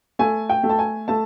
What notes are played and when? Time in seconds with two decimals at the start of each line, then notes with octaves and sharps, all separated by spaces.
0.19 A3 G#5
0.49 G5
0.63 A3
0.69 A5
0.79 G#5
1.08 A3 A5